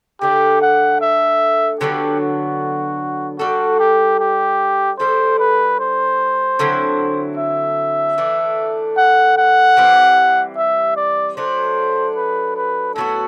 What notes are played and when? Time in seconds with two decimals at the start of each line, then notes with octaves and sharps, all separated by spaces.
0.21 D3 A3 D4 G4
0.62 F#5
1.01 E5
1.81 D3 F#3 B3 D4 G4
2.20 F#4
3.39 G3 D4 F#4 A4
3.79 G4
4.20 G4
4.99 G3 D4 A4 C5
5.39 B4
5.80 C5
6.59 D3 F#3 C4 E4
7.38 E5
8.18 E3 A3 D4
8.97 F#5
9.37 F#5
9.77 E3 G3 C4
10.57 E5
10.96 D5
11.37 F#3 A3 D4 C5
12.16 B4
12.57 B4
12.96 A2 F#3 B3 F#4 A4